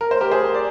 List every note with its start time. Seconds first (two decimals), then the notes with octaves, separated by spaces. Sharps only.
0.01 A#4
0.11 C5
0.21 G4 A#4
0.32 G#4 C5
0.54 D5